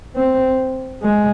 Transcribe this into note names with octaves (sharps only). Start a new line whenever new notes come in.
C4
G#3